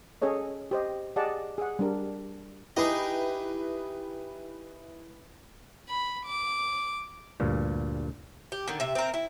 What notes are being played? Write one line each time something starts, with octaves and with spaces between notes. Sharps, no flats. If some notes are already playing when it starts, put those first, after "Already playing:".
C#4 G#4 A4 C#5 D#5
G4 C5 D#5
G4 G#4 D5 D#5 F#5 A5
G#4 F#5
G3 D4 A#4
D#4 E4 G4 G#4 B4 D#5
B5
D6
D2 G2 A#2
G4
D3 D#3
C3 E5
C4 A#4
E4